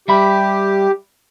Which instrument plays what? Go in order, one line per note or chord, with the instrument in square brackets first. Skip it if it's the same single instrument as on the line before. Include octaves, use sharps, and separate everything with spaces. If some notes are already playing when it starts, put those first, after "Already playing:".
[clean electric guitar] G3 E5 B5 [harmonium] G4